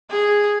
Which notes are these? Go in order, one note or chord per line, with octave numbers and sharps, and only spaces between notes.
G#4